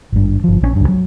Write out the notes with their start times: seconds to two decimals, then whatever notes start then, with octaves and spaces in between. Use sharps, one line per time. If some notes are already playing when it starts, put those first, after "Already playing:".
0.12 G#1 G2
0.44 G1 F3
0.61 A#1 E3 C#4
0.76 C#2 G2
0.88 F#3